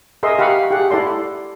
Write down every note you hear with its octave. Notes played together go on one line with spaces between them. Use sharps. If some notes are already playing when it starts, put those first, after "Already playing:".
G#4 A#4 D#5 E5 C6
G4 F5 F#5 B5 C#6
G4 G#4 F#5
E4 A4 D5 C6